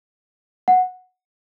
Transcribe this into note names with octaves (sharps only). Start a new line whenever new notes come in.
F#5